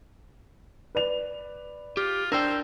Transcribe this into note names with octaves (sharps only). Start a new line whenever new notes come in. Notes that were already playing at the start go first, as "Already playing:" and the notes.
B4 D5 F7
F4 G4
D4 A#4 C5 D5 G5 E6